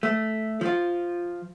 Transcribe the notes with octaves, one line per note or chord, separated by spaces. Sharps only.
A3
F3 F4